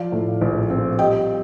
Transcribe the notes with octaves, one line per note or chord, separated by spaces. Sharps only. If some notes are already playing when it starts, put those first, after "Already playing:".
Already playing: F3 D5 F5
A2
A#1
C4
G3 D#5 G5